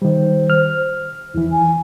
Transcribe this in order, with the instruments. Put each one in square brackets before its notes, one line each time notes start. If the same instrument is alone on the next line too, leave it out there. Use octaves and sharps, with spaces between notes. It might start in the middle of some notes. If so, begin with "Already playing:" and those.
[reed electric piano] D#3 G3 [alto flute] C5
[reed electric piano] F6
[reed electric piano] E2 E3 [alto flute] E4
[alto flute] G#5